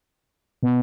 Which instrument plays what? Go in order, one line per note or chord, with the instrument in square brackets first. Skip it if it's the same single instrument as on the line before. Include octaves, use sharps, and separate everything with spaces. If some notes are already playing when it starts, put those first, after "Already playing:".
[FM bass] B2